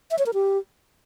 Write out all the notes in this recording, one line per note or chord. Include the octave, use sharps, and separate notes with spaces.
E5
C#5
A#4
G4